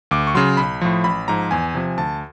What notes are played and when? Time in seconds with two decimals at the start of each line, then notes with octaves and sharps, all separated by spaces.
0.11 D2 D6
0.27 C#6
0.35 C#3 F#3 C6
0.57 B1 B5
0.81 A2 F3
1.04 A1 B5
1.28 G#2 F3 A#5
1.51 E2 G#5
1.74 C3 F3
1.98 D2 A5